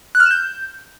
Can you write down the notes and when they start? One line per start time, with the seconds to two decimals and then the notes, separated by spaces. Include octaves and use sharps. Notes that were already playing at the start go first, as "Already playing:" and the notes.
0.15 F#6
0.20 F6
0.25 E7
0.31 G6